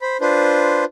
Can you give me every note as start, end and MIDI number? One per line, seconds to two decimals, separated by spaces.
0.01 0.17 72
0.01 0.17 83
0.21 0.85 62
0.21 0.85 65
0.21 0.85 71
0.21 0.85 72